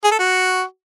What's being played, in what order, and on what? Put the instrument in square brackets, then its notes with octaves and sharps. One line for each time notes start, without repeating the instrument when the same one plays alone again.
[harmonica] G#4
A4
F#4